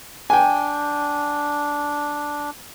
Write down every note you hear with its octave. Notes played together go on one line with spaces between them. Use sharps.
D4 G5 G#5